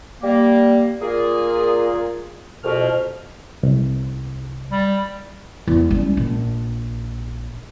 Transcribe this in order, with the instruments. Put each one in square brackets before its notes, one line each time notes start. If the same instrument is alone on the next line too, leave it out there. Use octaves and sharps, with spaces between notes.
[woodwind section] G3 A#3
A#2 A#3 F4 G#4
C2 F2 B2 F6
[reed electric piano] C2
[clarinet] G3
[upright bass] E2
G3 C#4
A#1